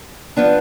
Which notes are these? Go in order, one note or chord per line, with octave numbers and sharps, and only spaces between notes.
F3 B3 D4